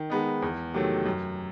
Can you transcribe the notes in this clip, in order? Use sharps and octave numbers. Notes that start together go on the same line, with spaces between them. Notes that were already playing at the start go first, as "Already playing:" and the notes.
Already playing: D#3
G#3 B3 D#4
E2
C3 D#3 F#3 A3
F#2